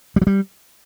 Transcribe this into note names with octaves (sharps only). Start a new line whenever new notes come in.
G3
F#3
G3